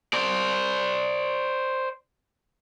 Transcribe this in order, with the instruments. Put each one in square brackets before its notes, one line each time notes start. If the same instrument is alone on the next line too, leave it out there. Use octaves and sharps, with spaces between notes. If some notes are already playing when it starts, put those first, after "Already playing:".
[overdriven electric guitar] C5 D5